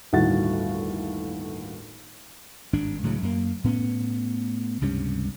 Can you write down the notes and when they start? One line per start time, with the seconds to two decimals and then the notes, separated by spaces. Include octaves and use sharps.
0.13 G1 D#2 A2 F#4 F#5 A6
2.73 G#1 G2 D4
3.03 C#2 A2 C#3 F#3
3.22 F#2 A#3
3.64 A2 B3 C#4
4.81 C#2 G2 C3 C#4